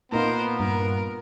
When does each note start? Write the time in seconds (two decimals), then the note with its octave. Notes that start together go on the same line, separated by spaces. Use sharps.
0.12 A#2 B3 D#4 F4 A#4 C5
0.60 G2 A#4